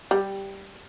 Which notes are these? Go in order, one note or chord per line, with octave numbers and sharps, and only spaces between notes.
G3